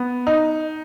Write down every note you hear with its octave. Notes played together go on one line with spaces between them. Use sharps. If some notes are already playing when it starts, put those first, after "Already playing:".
Already playing: B3
D#4